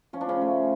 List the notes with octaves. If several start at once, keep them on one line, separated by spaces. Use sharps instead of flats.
F3 C#4
D4
C#3 C#4
A3